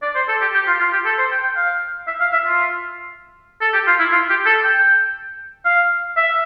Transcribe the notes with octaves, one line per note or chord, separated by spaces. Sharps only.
D5
C5
A4
G4
G4
F4
F4
G4
A4
C5
G5
G5
F5
E5
F5
E5
F4
A4
G4
F4
E4
F4
G4
A4
G5
F5
E5